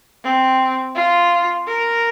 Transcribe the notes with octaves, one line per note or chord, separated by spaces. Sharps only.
C4
F4
A#4